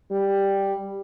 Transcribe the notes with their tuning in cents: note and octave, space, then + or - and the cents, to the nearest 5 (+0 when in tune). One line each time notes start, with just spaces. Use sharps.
G3 +5